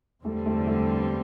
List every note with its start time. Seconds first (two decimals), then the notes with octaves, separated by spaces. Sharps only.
0.24 E2 D3 G3 A3 C4
0.46 A3
0.67 A3